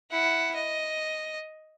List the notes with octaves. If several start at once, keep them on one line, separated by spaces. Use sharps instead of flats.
E4 F#5
D#5